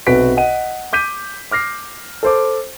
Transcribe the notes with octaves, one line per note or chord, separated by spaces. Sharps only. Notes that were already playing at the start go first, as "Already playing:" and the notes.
B1 C3 F#4 B4 B6 D7
D#5 F#5 D#7
D6 G6 B6 D#7
D6 F6 A#6 C7
A4 C5 D6